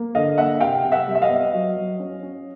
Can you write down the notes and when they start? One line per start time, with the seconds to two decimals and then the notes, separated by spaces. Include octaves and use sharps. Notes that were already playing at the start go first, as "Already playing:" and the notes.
Already playing: A#3
0.15 D3 D#5 F5
0.38 A#3 E5 F#5
0.60 C3 F5 G5
0.84 C3
0.92 E5 F#5
1.08 G3
1.15 E5
1.22 D#5 F5
1.30 B3
1.53 F#3
1.76 F#3
2.00 C#4
2.23 C#4